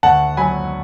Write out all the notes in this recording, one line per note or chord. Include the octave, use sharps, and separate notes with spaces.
D2 F#5 A5
F#3 G#5 B5